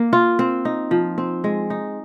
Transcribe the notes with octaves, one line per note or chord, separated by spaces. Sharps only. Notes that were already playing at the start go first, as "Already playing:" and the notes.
Already playing: A#3
F4
C4
D#4
F3
C4
G#3
D#4